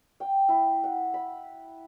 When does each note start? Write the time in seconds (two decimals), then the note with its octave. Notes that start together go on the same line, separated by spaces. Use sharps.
0.20 G5
0.49 E4
0.84 F#5
1.14 B5